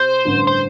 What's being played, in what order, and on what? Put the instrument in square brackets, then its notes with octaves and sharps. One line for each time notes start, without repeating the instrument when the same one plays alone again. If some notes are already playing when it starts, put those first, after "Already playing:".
Already playing: [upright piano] C3 [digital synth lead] C5
[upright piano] A1 G2 D3
[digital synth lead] C5